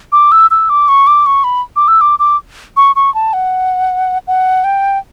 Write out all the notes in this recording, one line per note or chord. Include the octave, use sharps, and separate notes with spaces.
D6
E6
E6
D6
C#6
D6
C#6
B5
D6
E6
D6
D6
C#6
C#6
A5
F#5
F#5
G5